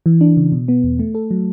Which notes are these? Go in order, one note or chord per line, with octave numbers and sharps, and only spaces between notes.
E3
D4
C#3
B2
B3
E2
A3
A4
F#3